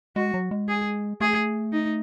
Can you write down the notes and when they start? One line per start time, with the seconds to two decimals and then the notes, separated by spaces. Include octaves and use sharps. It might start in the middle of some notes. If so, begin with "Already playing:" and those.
0.16 G#3 F#4
0.34 F#3
0.51 G#3
0.68 G#4
1.21 A3 G#4
1.73 D#4